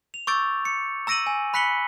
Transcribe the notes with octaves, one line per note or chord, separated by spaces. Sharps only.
F7
C#6 D6 E6 G6 A6 D7
C#7
A#5 E6 A#6 D7 D#7 F#7
G#5
B5 F#6 B6 C#7 F#7 G7